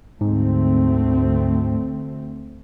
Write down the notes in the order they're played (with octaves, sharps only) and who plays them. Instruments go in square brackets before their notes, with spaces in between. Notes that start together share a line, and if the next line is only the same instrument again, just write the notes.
[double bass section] D2 A3 C4 [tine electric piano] G#2